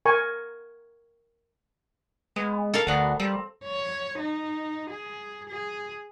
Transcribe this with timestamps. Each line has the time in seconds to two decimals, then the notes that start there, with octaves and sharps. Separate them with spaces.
0.05 A#4 G#5 C#6
2.36 G#3 B3
2.74 A4 A#4 F5
2.87 D2 B3 D4 F#4
3.20 G3 C4
3.64 C#5
4.19 D#4
4.91 G#4
5.49 G#4